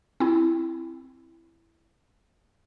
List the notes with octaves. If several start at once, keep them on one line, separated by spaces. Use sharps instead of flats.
C4 E4